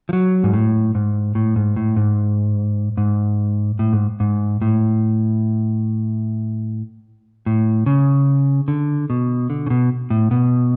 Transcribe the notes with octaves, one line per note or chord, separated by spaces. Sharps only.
F3
F#3
G#2
A2
G#2
A2
G#2
A2
G#2
G#2
A2
G#2
G#2
A2
A2
C#3
D3
B2
D3
C#3
B2
A2
B2